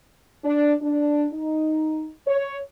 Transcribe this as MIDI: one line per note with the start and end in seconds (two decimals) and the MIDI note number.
0.44 0.73 62
0.81 1.25 62
1.33 2.07 63
2.26 2.58 73